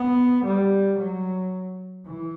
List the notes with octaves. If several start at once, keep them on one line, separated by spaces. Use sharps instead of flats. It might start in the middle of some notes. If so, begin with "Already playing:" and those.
Already playing: B3
G3
F#3
E3